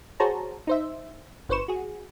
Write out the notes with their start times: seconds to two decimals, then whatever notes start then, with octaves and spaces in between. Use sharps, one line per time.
0.20 F#4 G#4 C5 C#5 A5 A#5
0.67 D#4 C5 E5
1.49 G1 B4 C5 C#6 E7
1.68 F#4 G#4